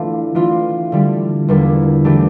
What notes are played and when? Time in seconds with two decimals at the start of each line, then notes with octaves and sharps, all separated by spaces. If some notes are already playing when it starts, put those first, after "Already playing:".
Already playing: E3 A3 D4 F4
0.35 E3 A3 D4 F4
0.92 D3 G3 D4
1.48 E2 D3 G3 A#3 D4
2.05 E3 A3 D4 G4